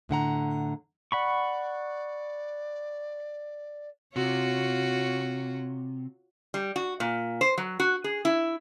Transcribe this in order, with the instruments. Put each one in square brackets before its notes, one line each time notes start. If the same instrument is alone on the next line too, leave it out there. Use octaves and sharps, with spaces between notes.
[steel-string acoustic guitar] A2 D3 F#5 A#5
[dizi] D5 [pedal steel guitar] F#5 B5 C#6
[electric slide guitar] C3 [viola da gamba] F4 F#4 C#5
[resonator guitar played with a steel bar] G3
F#4
A#2
C5
F#3
F#4
G#4
E4